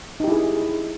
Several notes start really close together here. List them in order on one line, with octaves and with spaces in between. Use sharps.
D#4 G4 E4 G#4